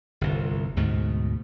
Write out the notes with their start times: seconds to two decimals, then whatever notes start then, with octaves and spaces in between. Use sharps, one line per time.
0.21 G1 C2
0.76 D2 G#2 B2 A3